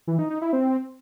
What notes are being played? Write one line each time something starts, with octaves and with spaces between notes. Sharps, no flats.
E3
D#4
D#4
E4
C4